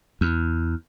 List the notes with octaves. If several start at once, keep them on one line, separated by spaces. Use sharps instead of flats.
E2